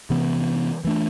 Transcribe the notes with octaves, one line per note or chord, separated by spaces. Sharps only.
C3 E3 B3
E3 A3 D4